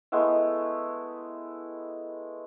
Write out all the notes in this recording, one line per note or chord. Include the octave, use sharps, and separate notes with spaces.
G#3 A3 B3 E4